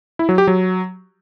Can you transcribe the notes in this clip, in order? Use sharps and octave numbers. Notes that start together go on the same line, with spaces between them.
E4
F#3
G4
F#3